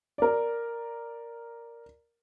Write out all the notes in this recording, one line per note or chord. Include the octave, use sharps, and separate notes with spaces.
A#4 D5